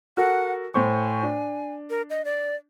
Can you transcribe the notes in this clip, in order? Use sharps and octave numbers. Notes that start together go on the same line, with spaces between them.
F#4 A4 A#4 F#5
A2 C5 G#5 C#6
D4
A#4
D#5
D5